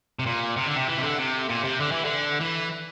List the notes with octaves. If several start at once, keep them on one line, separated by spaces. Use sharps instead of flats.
C3
A#2
C3
D3
C3
E3
C3
D3
C3
A#2
C3
D3
E3
D3
E3